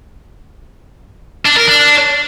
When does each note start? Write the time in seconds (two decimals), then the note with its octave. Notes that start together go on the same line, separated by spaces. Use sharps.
1.46 D4
1.57 A#4
1.68 D4